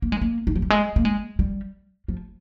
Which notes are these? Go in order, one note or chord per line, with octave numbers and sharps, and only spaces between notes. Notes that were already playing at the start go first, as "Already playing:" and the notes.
A#3
G#3
A#3
D#3
F3
G3
G#3
A#3
G#3
G3
F3